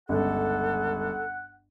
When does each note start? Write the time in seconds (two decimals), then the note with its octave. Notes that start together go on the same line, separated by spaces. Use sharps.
0.09 G1 C#2 A4 F#5